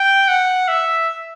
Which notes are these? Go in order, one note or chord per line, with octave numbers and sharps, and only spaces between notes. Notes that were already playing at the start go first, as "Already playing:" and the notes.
Already playing: G5
F#5
E5